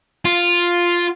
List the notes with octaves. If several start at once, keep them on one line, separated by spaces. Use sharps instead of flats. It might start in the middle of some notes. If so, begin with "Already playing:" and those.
F4